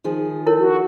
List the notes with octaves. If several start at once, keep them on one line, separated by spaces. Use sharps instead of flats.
D#3 F3 G#4
E4 A#4 C#5
F#4